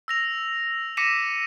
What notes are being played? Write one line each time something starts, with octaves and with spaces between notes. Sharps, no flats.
E6 A#6 F7
D6 A#6 B6 C#7 D#7 E7